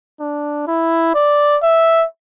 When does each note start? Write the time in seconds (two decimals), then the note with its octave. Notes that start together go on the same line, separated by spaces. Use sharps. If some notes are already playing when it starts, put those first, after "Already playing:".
0.20 D4
0.67 E4
1.14 D5
1.63 E5